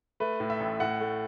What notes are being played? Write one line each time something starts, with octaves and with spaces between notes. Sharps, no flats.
A3 B4
A2
E5
A1
A2 F#5
A3